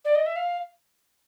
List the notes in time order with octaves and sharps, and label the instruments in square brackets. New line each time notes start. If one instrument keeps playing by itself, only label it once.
[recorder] D5
D#5
E5
F5